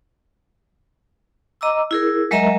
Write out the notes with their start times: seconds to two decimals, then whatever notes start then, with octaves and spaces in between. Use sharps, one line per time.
1.61 D#5 A#5 D6 E6
1.91 E4 G#4 A#4
2.31 F#3 G#3 A#4 D#5 E5 A#5